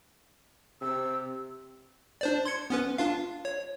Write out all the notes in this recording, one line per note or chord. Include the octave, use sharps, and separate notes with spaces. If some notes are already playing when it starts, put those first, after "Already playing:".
C3 E6
D4 C5 D5
C6 G#6 C#7
B3 C#4 B4
D4 F4 F5
C#5